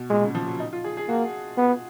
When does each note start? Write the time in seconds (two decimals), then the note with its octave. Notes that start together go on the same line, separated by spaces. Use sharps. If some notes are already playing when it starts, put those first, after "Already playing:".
Already playing: B2
0.10 A#2 G#3
0.23 C#3
0.35 F3
0.47 F#3
0.60 D#4
0.73 F4
0.84 G#4
0.97 G#4
1.09 A#3 F#4
1.58 B3